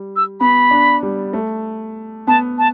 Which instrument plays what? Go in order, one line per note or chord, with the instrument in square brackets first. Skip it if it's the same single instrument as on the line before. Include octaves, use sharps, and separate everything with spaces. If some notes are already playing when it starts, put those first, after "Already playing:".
Already playing: [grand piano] G3
[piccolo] E6
[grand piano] B3 [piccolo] B5
[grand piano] D4
G3
A3
[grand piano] B3 [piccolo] A5
[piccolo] A5